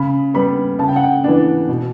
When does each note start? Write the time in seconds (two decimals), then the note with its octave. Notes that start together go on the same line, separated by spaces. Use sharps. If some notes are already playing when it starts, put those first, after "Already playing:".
Already playing: C#3 B5
0.34 G3 B3 B5
0.79 C#3 A5
0.88 G5
0.96 F#5
1.03 G5
1.24 E3 B3 D4
1.69 B2